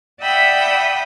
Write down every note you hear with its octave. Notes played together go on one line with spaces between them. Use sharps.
D5 E5 F#5 G5 B5 D#6